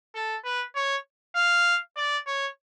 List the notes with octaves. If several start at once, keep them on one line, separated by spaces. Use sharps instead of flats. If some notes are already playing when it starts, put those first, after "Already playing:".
A4
B4
C#5
F5
D5
C#5